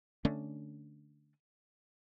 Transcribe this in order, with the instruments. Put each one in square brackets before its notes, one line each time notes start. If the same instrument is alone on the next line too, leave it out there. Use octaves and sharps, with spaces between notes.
[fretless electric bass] D3 A3 C#4 D4